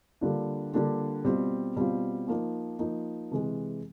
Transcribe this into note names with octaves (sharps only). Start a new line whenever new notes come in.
D3 G3 A#3 D4 F4
D3 G3 A#3 D4 F4
B2 G3 C4 F4
B2 G3 C4 F4
F3 A#3 D#4
F3 A#3 D#4
C3 E3 G#3